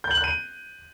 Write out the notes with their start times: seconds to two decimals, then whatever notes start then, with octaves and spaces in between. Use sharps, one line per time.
0.04 G6
0.11 F#7
0.17 F#6
0.24 D#7